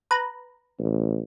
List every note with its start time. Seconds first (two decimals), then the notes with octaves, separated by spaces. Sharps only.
0.11 B4 A#5
0.79 A1